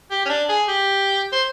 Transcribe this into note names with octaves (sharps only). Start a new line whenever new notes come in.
G4
C#4
D4
G#4
G4
C5